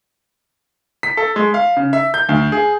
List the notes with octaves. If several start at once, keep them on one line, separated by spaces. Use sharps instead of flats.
B6
A4
G#3
F5
C#3
E5
G6
D2
G#4